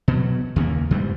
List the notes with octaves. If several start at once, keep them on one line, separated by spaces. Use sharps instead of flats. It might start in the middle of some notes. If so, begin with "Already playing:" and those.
B2 F#3
D#2 C#3 A3 A#3
E2 G#2 G3